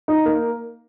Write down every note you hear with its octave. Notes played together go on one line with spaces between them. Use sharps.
D#4
A#3